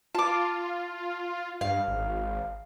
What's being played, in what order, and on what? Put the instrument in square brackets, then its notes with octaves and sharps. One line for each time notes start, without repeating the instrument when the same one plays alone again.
[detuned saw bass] F4 [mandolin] A5 D6
[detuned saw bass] G2 [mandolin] F5
[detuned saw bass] G#1